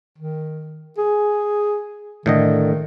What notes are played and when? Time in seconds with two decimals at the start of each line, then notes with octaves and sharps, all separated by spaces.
0.18 D#3
0.98 G#4
2.26 A2 D3 D#3 D#5